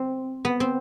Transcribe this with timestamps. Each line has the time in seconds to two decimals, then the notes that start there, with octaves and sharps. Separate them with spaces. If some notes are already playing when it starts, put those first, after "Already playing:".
Already playing: C4
0.45 B3
0.60 C4